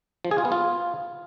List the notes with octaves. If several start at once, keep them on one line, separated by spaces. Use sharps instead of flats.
F3
G#4
F4
B3
F4